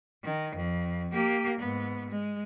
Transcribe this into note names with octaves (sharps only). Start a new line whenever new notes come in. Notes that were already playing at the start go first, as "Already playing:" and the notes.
D#3
F2
A#3 G4
G#2 B3
G#3